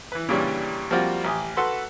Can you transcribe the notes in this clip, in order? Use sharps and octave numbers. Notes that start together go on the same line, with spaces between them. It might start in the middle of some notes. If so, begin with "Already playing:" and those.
E3 B4
A#2 C#3 E3 G3 C#4 D4
F3 G3 A#3 C4 F4 F#4
A1 G4 G#5 D#6
F#4 A4 B4 F#5 C6